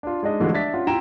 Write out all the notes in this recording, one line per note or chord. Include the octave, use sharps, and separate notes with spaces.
D4 F4
G#3 D4 D#4 D#5
D3 E3 F3 G#3 A3
D4 E5 A6 B6
C#4 F4 F#5
E4 F4 G5 A#5 E7